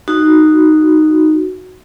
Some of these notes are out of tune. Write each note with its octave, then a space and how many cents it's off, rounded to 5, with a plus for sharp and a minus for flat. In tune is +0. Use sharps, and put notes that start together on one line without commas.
D#4 -5 F#4 +0